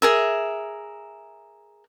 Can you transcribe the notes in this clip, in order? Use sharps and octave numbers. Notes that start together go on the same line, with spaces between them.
G#4 A#4 E5